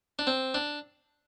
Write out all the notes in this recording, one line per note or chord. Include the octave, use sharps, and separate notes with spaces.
D4
C4
D4